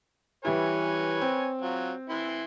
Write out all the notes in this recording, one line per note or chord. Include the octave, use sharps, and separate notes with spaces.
E3 G3 E4 B4 C#5 G#5
C4
F#3 F4
E3 E4 C6